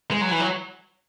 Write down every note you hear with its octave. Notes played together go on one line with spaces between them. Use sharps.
G#3
F#3
E3
F#3